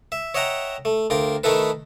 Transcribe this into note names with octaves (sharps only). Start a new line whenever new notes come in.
E5
C#5 D#5 E5 F#5 G5 A#5
A3
D2 F4 A#4 G5
D#3 A3 D#4 E4 A4 B4